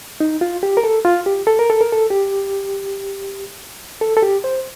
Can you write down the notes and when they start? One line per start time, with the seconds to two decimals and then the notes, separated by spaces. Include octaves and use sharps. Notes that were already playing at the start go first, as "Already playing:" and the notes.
0.20 D#4
0.41 F4
0.63 G4
0.77 A#4
0.84 A4
1.05 F4
1.26 G4
1.47 A4
1.59 A#4
1.70 A4
1.81 A#4
1.92 A4
2.10 G4
4.01 A4
4.17 A4
4.22 G4
4.44 C5